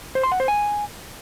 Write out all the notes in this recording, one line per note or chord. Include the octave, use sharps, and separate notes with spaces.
C5
C6
F#5
C5
G#5